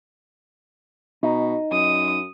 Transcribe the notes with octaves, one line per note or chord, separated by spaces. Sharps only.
B2 D#4
F#2 D#6